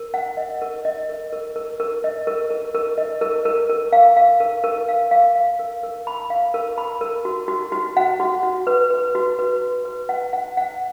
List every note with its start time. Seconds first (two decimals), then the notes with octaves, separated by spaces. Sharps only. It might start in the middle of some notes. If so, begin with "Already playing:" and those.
Already playing: A#4
0.14 F#5
0.37 D#5
0.62 A#4
0.85 D#5
1.09 A#4
1.33 A#4
1.56 A#4
1.80 A#4
2.04 D#5
2.27 A#4
2.50 A#4
2.75 A#4
2.98 D#5
3.21 A#4
3.45 A#4
3.69 A#4
3.93 F5
4.17 F5
4.40 A#4
4.64 A#4
4.89 F5
5.11 F5
5.36 F5
5.59 A#4
5.83 A#4
6.07 B5
6.30 F5
6.54 A#4
6.78 B5
7.01 A#4
7.25 F#4
7.48 F#4
7.72 F#4
7.97 F#5
8.20 F#4
8.43 F#4
8.67 B4
8.90 B4
9.15 F#4
9.39 B4
9.62 F#4
9.85 B4
10.09 F#5
10.33 F#5
10.57 F#5